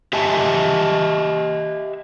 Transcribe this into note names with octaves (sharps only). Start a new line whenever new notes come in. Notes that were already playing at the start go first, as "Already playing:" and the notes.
G4 D#5 E5 F#5 G#5 A5